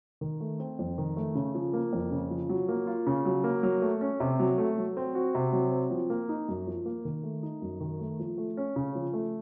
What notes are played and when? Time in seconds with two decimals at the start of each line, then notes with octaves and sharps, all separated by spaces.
0.21 D#3
0.40 A3
0.60 C4
0.79 F2
0.98 D#3
1.17 A3
1.35 C#3
1.54 F3
1.74 A#3
1.93 F2
2.12 C#3
2.30 F3
2.49 F#3
2.69 A#3
2.87 F4
3.07 C#3
3.25 F#3
3.44 A#3
3.63 F#3
3.82 A3
4.01 C#4
4.20 C3
4.39 F#3
4.58 A3
4.78 F#3
4.97 C4
5.15 F#4
5.35 C3
5.53 F#3
5.72 C4
5.90 F3
6.10 A#3
6.29 D#4
6.48 F#2
6.67 F3
6.86 A#3
7.05 D#3
7.23 A3
7.43 D#4
7.62 F#2
7.81 D#3
7.99 A3
8.19 F3
8.38 A3
8.57 C#4
8.76 C#3
8.95 F3
9.13 A3